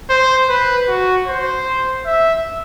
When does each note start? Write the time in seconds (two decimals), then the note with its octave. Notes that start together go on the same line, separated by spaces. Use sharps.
0.09 C5
0.49 B4
0.88 F#4
1.27 C5
2.06 E5